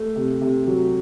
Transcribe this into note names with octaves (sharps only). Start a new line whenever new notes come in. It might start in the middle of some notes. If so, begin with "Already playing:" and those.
Already playing: A3
C3
C3
F#3